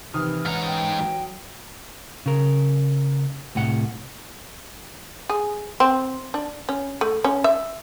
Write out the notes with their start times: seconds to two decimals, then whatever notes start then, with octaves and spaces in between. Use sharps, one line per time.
0.14 C3 D#3 E3 D#6 F6
0.45 G#2 C#4 F#5 A#5 F6
0.67 G5
1.00 F#3
2.26 C#3 A#4
3.55 C2 A2 F#5
5.29 G#4
5.80 C4
6.34 D4
6.69 C#4
7.01 A3
7.24 C#4
7.44 E5